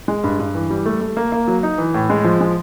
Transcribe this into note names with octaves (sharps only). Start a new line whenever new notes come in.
G#3
G2
G2
E3
G3
A3
A3
A#3
A#3
F#3
D#4
E3
A2
G#3
F3
G#3